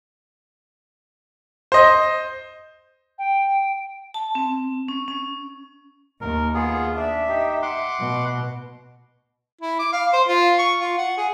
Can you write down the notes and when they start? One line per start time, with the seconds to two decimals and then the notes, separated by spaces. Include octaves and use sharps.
1.72 C5 D#5
3.19 G5
4.14 A5
4.35 C4
4.88 C#4
5.08 C#4
6.21 D#2 A#4
6.54 B3 F4 G#4
6.96 D4 E5
7.28 D#4 G4
7.62 F#5 C6 D6
7.99 B2
9.61 E4
9.79 D6
9.92 F5
10.13 C5
10.28 F4
10.59 C#6
10.80 F4
10.98 F#5
11.17 G#4